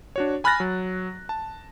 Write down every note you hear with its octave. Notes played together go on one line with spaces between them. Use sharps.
D4 F#4 C#5
G#5 B5 F6 F#6 A6 A#6
F#3
A5